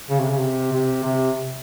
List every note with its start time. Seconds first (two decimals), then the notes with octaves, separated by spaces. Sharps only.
0.10 C#3
0.20 C3
0.30 C#3
0.40 C3
0.72 C3
1.04 C3